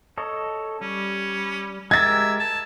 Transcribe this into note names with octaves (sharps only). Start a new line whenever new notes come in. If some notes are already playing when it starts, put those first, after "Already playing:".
A4 C#5 D#5
G3 C#4
G#3 G4 A#4 E5 G#6 A6
A5